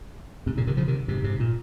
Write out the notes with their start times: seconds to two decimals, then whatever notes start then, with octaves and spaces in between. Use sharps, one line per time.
0.46 G#2 C3
0.57 A#2 C#3
0.67 C3 D#3
0.77 C#3 F3
0.88 C3 D#3
1.08 G#2 C3
1.24 G#2 C3
1.40 A#2